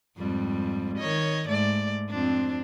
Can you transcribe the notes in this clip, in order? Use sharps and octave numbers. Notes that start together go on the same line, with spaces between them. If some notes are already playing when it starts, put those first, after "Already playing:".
F2 G#2 G3
D#3 C#5 D#5
G#2 A3 D5
F2 C4 D4